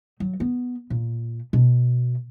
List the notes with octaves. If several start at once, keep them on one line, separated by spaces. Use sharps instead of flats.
F#3
B3
A#2
B2